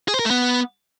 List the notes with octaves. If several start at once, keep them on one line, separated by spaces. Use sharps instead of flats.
G#4
C5
A#4
A3
B3